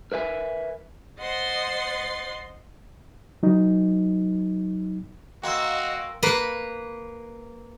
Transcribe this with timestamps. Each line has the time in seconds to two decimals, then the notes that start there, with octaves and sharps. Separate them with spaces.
0.12 A#4 B4 E5 G#5
1.20 C5 D#5 F#5 C6 A6
3.43 F#3 D#4
5.43 A#3 F#4 D#5 G5 C6 E6
6.23 A#3 B4